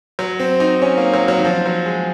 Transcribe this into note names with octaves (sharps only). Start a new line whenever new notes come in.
F#3
C4
D#4
C#4
A#3
F#3
F#3
D#3
F3
F#3
G#3